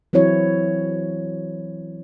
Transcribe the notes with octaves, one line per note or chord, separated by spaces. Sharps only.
E3 F#3 C4 E4 C#5